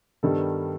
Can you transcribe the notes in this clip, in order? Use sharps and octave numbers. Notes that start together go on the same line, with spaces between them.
G2 D#3 G3 B3 A4